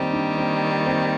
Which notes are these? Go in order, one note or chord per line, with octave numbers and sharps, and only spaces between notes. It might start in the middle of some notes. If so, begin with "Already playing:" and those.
Already playing: D#3 G3 A#3 C4
D4
C4
C4